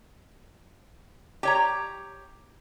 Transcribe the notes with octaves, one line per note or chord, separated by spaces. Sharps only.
G4 C#5 A#5